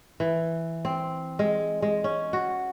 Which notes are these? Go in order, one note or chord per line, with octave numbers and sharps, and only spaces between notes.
E3
C4
G#3
G#3
C#4
F#4